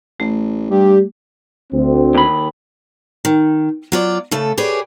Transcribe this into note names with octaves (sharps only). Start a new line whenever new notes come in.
A1 A3
G2 G3 G4
D2 C4
D#2 B5
D#3
F#3 F4 D5
C#3 A3 A4
G4 G#4 B4 C#5 D5